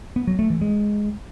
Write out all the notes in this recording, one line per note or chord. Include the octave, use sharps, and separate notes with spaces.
B3
F#3
A3
E3
G#3